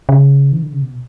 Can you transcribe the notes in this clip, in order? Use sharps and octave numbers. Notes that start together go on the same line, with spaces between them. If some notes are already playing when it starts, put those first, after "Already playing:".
C#3
E3
D3
C#3
B2